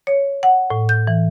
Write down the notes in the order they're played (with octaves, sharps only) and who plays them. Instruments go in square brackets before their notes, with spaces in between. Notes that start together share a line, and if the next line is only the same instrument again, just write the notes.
[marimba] C#5
F#5
A2
G6
E3